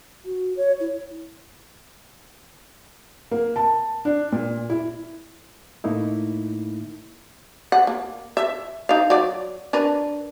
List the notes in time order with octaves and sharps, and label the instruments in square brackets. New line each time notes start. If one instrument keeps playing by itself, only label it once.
[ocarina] F#4
C#5
E4
[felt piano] A#3
A5
D4
A#2
E4
[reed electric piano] A2 A3 A#3 D#4 E4
[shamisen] F#5
A#3
E5
D#4 F5
F#3 D5
D4 A#4 B4